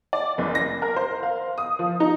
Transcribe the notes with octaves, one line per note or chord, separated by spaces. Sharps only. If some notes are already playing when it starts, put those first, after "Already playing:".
D5
F#1
A#6
A#4
C5
F5
D#6
F3
D#4